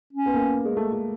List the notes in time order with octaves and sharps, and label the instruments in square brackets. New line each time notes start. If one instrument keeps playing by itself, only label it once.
[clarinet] C#4
[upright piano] B3
A#3
G#3
A3
A3